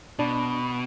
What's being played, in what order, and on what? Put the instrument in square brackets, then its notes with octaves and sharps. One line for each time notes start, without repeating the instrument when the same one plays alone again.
[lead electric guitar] B2 [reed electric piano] D4 [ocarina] B5